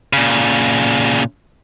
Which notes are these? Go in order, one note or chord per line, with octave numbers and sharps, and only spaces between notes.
A#2 C#3